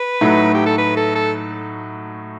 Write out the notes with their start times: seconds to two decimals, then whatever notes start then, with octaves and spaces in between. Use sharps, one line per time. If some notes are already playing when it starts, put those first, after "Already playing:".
Already playing: B4
0.21 A2 F#3 A3 D#4 F#4
0.55 G4
0.66 A4
0.78 B4
0.97 A4
1.15 A4